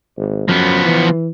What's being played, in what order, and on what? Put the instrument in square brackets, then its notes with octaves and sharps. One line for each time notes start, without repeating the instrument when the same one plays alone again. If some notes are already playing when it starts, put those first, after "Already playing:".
[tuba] G#1
[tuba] F#2 [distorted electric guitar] F3 B3
[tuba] E3